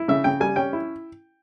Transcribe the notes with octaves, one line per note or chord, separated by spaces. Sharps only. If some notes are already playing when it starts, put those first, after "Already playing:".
Already playing: E4
C#3 E5
C#3 G5
G3 G#5
C#4 G5
E4